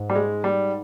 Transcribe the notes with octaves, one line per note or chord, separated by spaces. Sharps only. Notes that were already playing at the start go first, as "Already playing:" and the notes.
Already playing: G#2
G3
G#3
G3